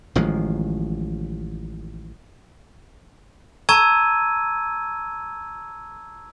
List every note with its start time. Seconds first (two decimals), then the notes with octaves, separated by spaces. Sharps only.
0.15 A1 D#3 F3 G#3
3.69 A5 A#5 C#6 E6 G#6 D#7